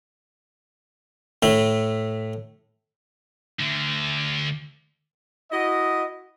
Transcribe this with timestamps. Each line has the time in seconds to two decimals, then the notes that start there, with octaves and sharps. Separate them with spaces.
1.43 A2 A3
3.59 D2 D3
5.51 E4 F#4 D#5